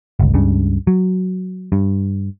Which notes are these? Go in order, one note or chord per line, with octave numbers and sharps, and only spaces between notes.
G1 C#2
C#2 G2 C#3
F#3
G2